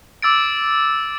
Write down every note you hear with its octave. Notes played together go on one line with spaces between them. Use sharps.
D6 E6 A6 D7